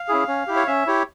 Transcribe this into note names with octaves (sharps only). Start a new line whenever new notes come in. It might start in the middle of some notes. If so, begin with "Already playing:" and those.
Already playing: F5
C#4 E4 G#4
C#4
E4 G4
C#5
C#4 E5
E4 G4 C#5